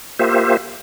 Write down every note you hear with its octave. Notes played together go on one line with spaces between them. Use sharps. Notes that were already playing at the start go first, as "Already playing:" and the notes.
A#3 F4 G4 C5 E5